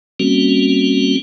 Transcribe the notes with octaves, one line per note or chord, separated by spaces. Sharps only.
G3 A#3 C4 C#4 F#4